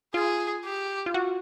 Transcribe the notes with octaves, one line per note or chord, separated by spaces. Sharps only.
F4 G#4
G4
F4
F#4